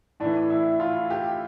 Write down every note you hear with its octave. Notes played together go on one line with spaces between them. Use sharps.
A2 E3 D4
E4
F4
G4